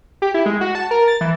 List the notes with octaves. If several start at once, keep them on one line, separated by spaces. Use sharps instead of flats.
G4
E4
G#3
F#4
A5
A#4
A6
E3